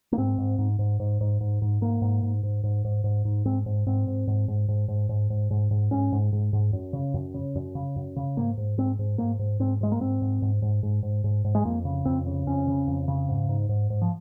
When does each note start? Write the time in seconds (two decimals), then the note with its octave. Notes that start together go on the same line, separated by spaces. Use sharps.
0.12 A#3
0.18 G#2 C4
0.38 G#2
0.59 G#2
0.79 G#2
1.00 G#2
1.21 G#2
1.41 G#2
1.62 G#2
1.81 G#2 A#3
2.02 G#2
2.23 G#2
2.43 G#2
2.64 G#2
2.85 G#2
3.04 G#2
3.25 G#2
3.45 G#2 C4
3.66 G#2
3.87 G#2 C4
4.07 G#2
4.27 G#2
4.48 G#2
4.68 G#2
4.88 G#2
5.09 G#2
5.30 G#2
5.51 G#2
5.71 G#2
5.91 G#2 C#4
6.12 G#2
6.33 G#2
6.53 G#2
6.73 F#2
6.93 C#3
7.14 F#2
7.34 C#3
7.55 F#2
7.75 C#3
7.96 F#2
8.16 C#3
8.37 G#2 A#3
8.58 G#2
8.78 G#2 C4
8.99 G#2
9.18 G#2 A#3
9.39 G#2
9.60 G#2 C4
9.81 G#2 G#3
9.92 A#3
10.00 G#2 C4
10.22 G#2
10.42 G#2
10.62 G#2
10.83 G#2
11.03 G#2
11.24 G#2
11.44 G#2
11.55 G#3
11.65 F2 A#3
11.85 C#3
12.05 F2 C4
12.27 C#3
12.47 F2 C#4
12.67 C#3
12.87 F2
13.08 C#3
13.29 G#2
13.49 G#2
13.69 G#2
13.90 G#2
14.02 F3